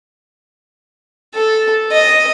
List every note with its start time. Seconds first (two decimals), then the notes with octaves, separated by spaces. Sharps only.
1.34 A4
1.91 D#5